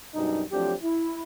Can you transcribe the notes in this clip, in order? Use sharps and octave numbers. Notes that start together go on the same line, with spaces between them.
F#2 B2 G3 D4 D#4
F3 F#3 A3 C4 D4 G4
E4